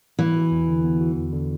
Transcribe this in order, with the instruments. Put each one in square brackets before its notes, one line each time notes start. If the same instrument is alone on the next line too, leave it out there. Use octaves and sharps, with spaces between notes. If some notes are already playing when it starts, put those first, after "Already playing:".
[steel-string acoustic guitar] E3 [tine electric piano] B3
[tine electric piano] F#4
E2
D3
B3
F#4
E2
D3